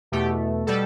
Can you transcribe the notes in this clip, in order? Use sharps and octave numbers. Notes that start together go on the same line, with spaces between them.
E2 B2 A3 G4
B2 G3 A4